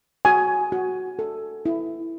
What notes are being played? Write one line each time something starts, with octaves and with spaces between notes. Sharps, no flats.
F#4 G#5
F#4
A4
E4